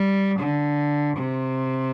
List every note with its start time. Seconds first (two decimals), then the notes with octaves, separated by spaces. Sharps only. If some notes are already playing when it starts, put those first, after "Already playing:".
Already playing: G3
0.39 D3
1.17 C3